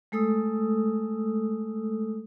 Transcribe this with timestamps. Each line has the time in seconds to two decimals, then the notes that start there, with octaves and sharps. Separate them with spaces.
0.12 G#3 A3 A4 D#6 E6